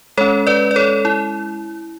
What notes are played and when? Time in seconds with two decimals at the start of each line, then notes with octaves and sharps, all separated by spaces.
0.17 G#3 C#4 A4 C#5
0.47 B4 D5
0.71 D5
0.76 A4 C#5
1.05 E4